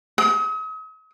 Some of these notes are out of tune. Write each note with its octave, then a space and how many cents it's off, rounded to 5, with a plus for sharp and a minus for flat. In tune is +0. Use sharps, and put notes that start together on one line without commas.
D#6 +45